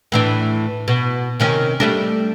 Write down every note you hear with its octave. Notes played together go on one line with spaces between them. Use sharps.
A2 E3 D4
B2
C3 D#3 C#4
G3 A3 D4